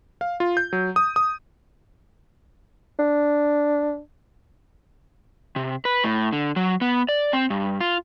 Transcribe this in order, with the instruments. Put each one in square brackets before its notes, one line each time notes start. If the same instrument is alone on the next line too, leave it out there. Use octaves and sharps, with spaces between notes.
[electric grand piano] F5
F4
G6
F#3
D#6
D#6
[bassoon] D4
[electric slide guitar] C3
B4
A2
D3
F#3
B3
D5
C4
G2
F4